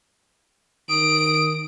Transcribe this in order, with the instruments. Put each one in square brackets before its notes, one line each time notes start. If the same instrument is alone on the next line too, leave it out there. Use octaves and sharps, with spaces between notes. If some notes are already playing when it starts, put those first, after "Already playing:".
[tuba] D#3 [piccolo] D#6 [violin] D7